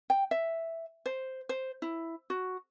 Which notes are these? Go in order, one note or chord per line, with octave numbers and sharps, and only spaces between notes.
G5
E5
C5
C5
E4
F#4